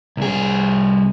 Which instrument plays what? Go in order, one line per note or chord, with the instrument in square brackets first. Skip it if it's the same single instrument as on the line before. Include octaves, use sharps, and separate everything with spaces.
[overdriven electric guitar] C2 G#4